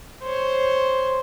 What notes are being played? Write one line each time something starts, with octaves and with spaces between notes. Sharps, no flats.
C5 C#5